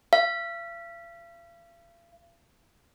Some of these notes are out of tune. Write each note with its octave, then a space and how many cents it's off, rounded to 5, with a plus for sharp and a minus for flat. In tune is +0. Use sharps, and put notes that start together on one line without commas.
F5 -45